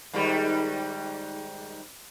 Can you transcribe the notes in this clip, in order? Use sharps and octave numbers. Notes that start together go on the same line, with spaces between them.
G#2 D#3 G3